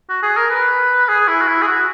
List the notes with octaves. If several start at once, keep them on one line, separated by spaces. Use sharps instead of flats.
F#4
G#4
A#4
B4
G#4
E4
F#4
E4
G#4
F#4